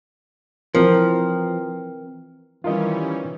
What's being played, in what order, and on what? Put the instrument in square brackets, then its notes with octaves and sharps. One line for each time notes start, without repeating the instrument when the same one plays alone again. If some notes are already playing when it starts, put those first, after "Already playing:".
[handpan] E3 C4 A#4 [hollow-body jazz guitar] F3
[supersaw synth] D#3 G3 C#4 [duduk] E3 [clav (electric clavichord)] F4 A#4 D#5